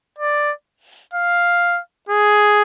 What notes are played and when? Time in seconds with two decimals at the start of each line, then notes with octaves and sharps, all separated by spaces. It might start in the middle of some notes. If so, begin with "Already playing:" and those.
0.18 D5
1.14 F5
2.09 G#4